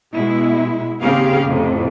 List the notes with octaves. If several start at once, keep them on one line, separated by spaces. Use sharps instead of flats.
B2 G#3 E4
D#2 C#3 C4 G4 G#4 F5
F2 A2 C3